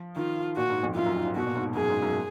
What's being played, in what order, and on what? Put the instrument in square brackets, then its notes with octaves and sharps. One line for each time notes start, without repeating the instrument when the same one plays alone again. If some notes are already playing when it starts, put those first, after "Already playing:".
Already playing: [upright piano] F3
[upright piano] D#3 [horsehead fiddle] F4
[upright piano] A#2 [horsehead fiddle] F#4
[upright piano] G#2
F2
[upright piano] F#2 [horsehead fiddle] F4
[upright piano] F#2
G#2
G#2
[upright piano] B2 [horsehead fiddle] F#4
[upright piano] A#2
G#2
G#2
[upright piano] F#2 [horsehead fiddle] G#4
[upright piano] G#2
F#2